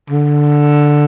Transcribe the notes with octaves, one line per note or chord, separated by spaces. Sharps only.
D3